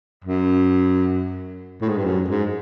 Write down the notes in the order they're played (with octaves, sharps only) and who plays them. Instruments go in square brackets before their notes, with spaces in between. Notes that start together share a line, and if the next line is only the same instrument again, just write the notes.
[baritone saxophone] F#2
A2
G#2
G2
F#2
G#2